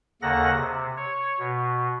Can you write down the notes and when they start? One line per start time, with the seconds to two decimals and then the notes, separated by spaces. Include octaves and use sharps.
0.22 D#2 C#3 A#3 A4 F#5 A#6
0.55 C3
0.97 C#5
1.39 B2